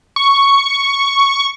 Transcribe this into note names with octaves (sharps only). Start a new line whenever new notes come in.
C#6